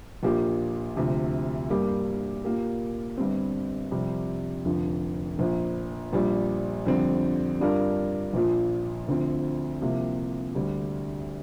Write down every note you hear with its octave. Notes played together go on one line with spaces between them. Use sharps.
A#1 A#2 A#3 G4
D2 C3 F3
G2 G3 A#3 G4 A#4
A#2 A#3 G4 A#4
G1 G2 G3 C4
F2 C3 G3
F1 F2 D3 F3
A#1 A#2 F3
A#1 A#2 G3
F2 D3 G3 C4
G2 G3 D4 F4 A#4
A#1 A#2 F3
D2 D3 F3 C4
C2 C3 F3 A#3 G4
D2 D3 G3